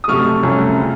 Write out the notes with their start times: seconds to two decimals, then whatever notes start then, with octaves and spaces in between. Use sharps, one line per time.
0.04 D#6
0.08 F2 C3 F#3 A3 C#6 F6
0.43 C2 C3 F3 A3 C#4
0.80 C#3